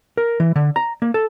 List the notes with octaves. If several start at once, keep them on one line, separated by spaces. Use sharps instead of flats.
A#4
E3
D3
A#5
A#3
A4